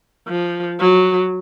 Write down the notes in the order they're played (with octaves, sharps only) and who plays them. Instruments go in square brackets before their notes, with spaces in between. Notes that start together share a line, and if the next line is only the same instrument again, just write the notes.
[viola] F3
F#3